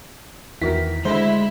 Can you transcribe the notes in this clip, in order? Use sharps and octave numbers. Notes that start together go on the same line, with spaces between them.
E2 D#3 E4 F#4 A#4 B6
D2 G#3 E4 C5